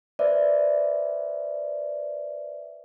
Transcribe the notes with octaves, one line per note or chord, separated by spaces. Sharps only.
B4 C5 D5 E5